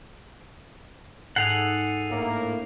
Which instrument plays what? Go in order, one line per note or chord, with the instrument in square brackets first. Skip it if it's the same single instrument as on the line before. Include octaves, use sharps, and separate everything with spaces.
[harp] G#2 [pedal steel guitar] G#4 A4 F#5 [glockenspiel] C7 F7
[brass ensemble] A2 A#3 [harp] D4